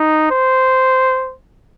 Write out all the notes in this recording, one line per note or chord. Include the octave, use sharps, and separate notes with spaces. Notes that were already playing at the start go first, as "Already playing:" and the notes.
Already playing: D#4
C5